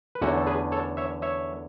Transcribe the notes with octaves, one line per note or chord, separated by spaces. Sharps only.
B4
E2 D3 A3 C#4 F#4 A4
A4
G#4 B4
A4 C#5
C#5 E5
C#5 E5